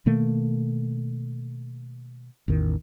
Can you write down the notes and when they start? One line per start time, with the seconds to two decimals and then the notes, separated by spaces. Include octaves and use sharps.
0.06 B2 D#3 A3 A#3
2.48 A1 E2 D#3